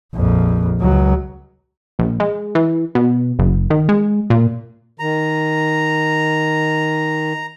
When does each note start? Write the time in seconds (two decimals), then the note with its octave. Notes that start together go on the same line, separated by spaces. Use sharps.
0.15 A#1 F2
0.80 C#2 F#3
1.99 A#1
2.20 G#3
2.55 E3
2.95 B2
3.39 F#1
3.70 D#3
3.89 G#3
4.30 A#2
4.99 D#3 A#5